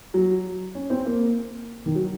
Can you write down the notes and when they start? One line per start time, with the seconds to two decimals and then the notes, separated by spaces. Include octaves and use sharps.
0.14 F#3
0.75 C#4
0.90 C4
1.05 A#3
1.86 D#3
1.95 F#3